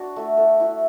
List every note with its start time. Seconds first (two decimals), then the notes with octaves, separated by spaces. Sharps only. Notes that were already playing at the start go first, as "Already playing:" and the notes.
Already playing: D4 F#4
0.16 A3
0.37 A4
0.60 E4